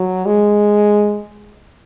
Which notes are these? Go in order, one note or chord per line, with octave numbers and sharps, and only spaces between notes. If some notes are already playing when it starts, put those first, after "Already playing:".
Already playing: F#3
G#3